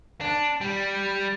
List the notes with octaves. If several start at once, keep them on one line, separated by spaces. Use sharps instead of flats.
D4
G3